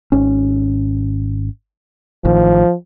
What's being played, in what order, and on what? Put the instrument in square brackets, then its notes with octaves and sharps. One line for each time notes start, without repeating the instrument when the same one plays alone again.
[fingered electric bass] G#1 C#4
[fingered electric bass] A1 A2 D#3 [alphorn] F3